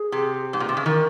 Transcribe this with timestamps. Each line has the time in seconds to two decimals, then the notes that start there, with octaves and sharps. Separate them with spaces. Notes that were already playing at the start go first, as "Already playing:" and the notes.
Already playing: G#4
0.12 C3
0.53 G#2
0.60 A#2
0.69 C3
0.77 C#3
0.85 D#3 A#4